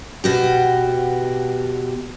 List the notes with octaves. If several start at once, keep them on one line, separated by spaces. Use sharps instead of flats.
B2 F#4 G4